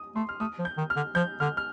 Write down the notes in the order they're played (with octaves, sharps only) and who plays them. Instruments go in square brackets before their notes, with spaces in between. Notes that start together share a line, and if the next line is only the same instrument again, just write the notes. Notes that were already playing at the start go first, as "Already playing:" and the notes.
Already playing: [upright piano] D#6
[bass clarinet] A3 [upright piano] C6
[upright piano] F6
[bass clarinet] A3 [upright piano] D#6
[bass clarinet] F3
[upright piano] G6
[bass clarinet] D#3
[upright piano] F6
[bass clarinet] D3
[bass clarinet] F3 [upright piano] G6
[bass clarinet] D3 [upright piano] F6
[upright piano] F6